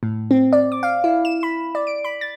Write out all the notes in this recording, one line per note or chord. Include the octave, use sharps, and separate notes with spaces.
A2
C4
D5
D6
F5
E4
E7
B5
D5
D7
B5
A6